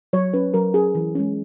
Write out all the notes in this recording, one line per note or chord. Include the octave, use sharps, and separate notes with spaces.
F#3 C#5
C#4 B4
F#3 A#4
C#4 G#4
E3
G#3 C#4